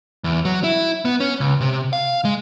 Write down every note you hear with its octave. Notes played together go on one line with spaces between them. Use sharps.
E2
F#3
E4
B3
C#4
C#2
C3
F5
G#3